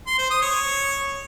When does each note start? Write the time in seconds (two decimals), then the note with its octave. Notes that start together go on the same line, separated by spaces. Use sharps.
0.07 C6
0.19 C5
0.30 D#6
0.42 C#5